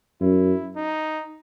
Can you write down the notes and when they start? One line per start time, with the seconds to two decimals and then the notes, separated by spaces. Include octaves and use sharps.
0.21 F#2 E4
0.75 D#4